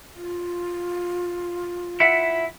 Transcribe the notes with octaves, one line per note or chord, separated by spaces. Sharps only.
F4
E4 E5 F#5